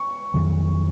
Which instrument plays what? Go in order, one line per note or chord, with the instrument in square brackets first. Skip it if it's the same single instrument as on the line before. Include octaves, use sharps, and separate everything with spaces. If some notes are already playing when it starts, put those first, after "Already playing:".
Already playing: [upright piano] C#6
[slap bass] F2 D#3 F#3